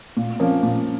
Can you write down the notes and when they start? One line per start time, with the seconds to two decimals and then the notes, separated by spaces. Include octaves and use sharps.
0.17 A#2
0.39 F3 A#3 C#4
0.63 A#2